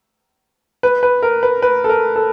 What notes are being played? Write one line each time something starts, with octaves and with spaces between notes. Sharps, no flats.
B4
B4
A#4
B4
B4
A4
A#4
A4